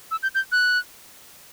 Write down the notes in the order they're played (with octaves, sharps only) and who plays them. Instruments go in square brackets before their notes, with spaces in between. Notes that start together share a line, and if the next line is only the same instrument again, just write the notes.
[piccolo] E6
G6
G6
F#6